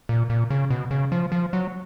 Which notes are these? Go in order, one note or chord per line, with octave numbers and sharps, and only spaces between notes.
A#2
A#2
C#3
B2
C#3
F3
F3
F#3